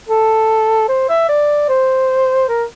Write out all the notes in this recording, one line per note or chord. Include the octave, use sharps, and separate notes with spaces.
A4
C5
E5
D5
C5
A#4